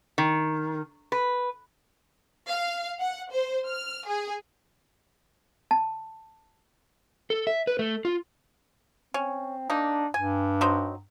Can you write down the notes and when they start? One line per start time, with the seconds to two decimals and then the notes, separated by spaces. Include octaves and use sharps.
0.18 D#3
1.12 B4
2.48 F5
3.00 F#5
3.31 C5
3.67 F6
4.07 G#4
5.71 A5
7.30 A4
7.47 E5
7.67 B4
7.79 A3
8.05 F4
9.14 C4 C#4
9.70 A#3 D4 D#4
10.14 G2 G#5
10.61 F#3 C4 D#4